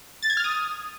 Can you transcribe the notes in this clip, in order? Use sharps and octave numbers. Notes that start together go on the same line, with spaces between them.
A6
G#6
F6
D#6